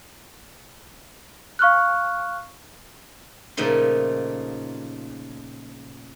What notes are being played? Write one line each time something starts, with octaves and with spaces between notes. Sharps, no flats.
F5 C#6 F6 F#6
A#2 C#3 F3 A3 D#4 C6